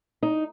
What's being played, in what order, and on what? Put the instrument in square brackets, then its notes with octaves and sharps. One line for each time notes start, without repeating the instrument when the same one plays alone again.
[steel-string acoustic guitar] D#4